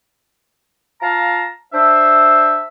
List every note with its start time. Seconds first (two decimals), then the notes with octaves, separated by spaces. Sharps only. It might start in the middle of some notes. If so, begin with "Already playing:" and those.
1.01 F4 F5 A5 A#5
1.73 D4 C5 E5